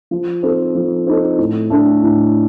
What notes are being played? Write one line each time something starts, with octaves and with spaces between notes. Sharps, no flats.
F3
C4 D#4 A4
F3
C4 D#4 A4
A2
A3 D4 A4
A2